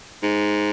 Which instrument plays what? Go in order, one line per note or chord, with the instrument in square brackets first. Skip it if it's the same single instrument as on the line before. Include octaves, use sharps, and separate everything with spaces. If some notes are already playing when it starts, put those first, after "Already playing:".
[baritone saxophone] G#2